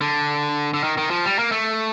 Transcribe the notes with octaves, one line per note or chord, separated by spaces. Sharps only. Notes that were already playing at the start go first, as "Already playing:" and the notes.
D3
D3
D#3
D#3
F3
G3
A#3
A3